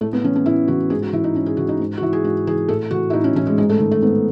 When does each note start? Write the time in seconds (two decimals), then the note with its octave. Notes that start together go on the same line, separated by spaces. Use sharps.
0.01 A2 A3
0.13 B3
0.24 E3 C#4
0.35 C#4
0.46 A2 E4
0.68 E3 F#4
0.90 G#2 G#4
1.02 F#4
1.13 E3 E4
1.24 D#4
1.35 G#2 C#4
1.46 G#4
1.57 E3 F#4
1.69 D#4
1.80 G#2
1.97 F#4
2.01 E3 E4
2.13 G#4
2.24 G#2 F#4
2.47 E3 G#4
2.68 A2 A4
2.91 E3 F#4
3.10 E4
3.13 A2 D#4
3.24 C#4
3.35 E3 C#4
3.47 G#3
3.58 G#2 G#3
3.70 A3
3.80 D#3
3.91 A3
4.02 G#2 B3